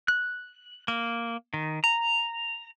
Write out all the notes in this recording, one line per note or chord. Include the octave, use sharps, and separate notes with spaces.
F#6
A#3
D#3
A#5